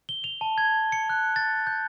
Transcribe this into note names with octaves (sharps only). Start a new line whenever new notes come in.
G7
F7
A5
G#6
C#7
F#6
A6
G6